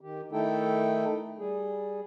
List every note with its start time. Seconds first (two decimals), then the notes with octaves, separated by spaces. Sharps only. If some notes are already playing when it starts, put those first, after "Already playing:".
0.01 D#3 G4
0.32 D#3 A3 D#4 E4 A4 G5
1.39 G3 G#4